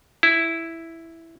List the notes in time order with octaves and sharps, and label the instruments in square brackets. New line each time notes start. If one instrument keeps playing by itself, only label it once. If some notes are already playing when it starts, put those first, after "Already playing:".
[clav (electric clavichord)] E4